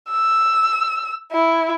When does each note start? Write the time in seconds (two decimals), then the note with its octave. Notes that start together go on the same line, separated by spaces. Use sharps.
0.11 E6
1.32 E4